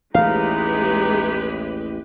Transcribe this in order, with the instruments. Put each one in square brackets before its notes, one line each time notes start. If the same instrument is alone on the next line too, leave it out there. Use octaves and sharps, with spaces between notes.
[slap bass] A1 D#2 A2 [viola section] G#3 G4 B4 [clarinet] D#4 [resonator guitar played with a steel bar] F5